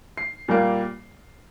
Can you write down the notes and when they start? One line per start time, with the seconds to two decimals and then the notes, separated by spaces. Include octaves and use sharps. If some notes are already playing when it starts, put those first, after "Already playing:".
0.17 C7
0.48 A#2 G3 A#3